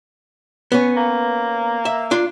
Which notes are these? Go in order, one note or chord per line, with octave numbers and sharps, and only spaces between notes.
B3 C#4
A#3
E5
D4 F4